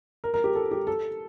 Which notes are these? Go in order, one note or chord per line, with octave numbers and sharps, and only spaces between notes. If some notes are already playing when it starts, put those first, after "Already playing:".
A#4
A#4
G4
A4
G4
A4